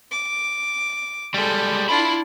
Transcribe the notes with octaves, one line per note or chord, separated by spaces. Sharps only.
D6
G3 G#3 A4
D4 E4 F4 B5